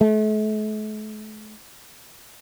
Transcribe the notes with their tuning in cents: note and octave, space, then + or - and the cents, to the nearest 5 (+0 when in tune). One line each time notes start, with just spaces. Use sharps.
A3 -40